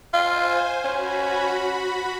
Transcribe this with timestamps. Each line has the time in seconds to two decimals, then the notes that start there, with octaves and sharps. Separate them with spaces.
0.13 F4 C5 G#5
0.85 C#4 F#4 B5